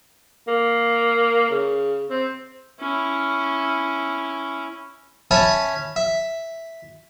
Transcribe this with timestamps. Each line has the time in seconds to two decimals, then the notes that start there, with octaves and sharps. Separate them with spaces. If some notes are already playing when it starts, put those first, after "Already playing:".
0.48 A#3
1.51 C#3
2.10 C4
2.80 C#4 E4
5.31 C#4 C#5 E5 G#5 A5 B5
5.96 E5